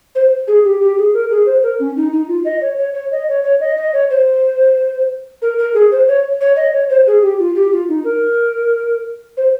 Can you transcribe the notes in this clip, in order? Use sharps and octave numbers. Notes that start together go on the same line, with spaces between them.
C5
G#4
G4
G4
G#4
A#4
G#4
C5
A#4
C#4
D#4
D#4
F4
D#5
C#5
C#5
C#5
D#5
C#5
C#5
D#5
D#5
C#5
C5
A#4
A#4
G#4
C5
C#5
C#5
D#5
C#5
C5
G#4
G4
F4
G4
F4
D#4
A#4
C5